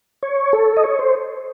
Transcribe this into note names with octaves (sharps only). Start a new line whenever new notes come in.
C#5
A4
D#5
C#5
C5